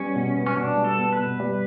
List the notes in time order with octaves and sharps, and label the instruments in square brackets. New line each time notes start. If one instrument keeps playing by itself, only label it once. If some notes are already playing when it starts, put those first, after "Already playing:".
Already playing: [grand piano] G3 B3 [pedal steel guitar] C#4
[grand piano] B2
B3
[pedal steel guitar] C#4
[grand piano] B2 [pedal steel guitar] D4
[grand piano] G3
[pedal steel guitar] A4
[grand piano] B3
[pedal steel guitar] B4
[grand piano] B2
G3